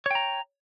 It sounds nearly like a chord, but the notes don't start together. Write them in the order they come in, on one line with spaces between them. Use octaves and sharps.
C#5 G5 A#5